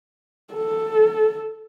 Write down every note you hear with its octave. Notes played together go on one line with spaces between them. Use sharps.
A4